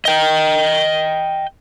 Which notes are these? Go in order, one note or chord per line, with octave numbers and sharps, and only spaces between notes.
D#5 G5